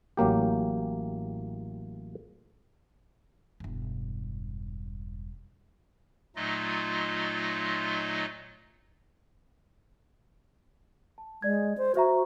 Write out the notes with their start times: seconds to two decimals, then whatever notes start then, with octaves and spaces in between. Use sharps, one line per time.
0.17 A1 F#3 A#3 G4
3.60 E1 G2
6.36 A#2 F#3 A3 D#4 F4 D#5
11.18 A5
11.42 G#3 D5 G#6
11.78 C5
11.95 F#4 C5 E5 A#5